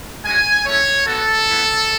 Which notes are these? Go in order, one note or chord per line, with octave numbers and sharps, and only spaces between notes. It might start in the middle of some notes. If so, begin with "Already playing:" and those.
G#3 C#4 F#4 G#5
A3 C#4 E4 C#5
B3 F#4 A4
B3 E4